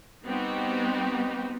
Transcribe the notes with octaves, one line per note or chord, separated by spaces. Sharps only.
G3 B3 C4 D#4 F#4 G4